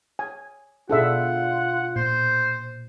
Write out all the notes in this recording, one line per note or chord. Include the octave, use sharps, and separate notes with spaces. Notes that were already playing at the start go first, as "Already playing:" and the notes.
G#5
B2 D4 F4 G#4 A4 E5 F#5
A#2 C5